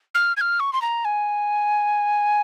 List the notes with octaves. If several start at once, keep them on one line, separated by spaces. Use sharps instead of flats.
F6
G#6
F6
C#6
C6
A#5
G#5